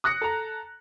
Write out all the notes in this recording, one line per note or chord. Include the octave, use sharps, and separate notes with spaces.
D#6 F#6 A#6 C#7
A4 A#5